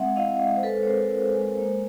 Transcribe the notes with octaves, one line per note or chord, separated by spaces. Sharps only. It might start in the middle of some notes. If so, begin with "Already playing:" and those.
Already playing: G#3 C4 E5 F#5
E4 D#5 F5
G#3
C5
G#3 A4 B4
C#5
C4 A#4 C5
E4
G#3
A#3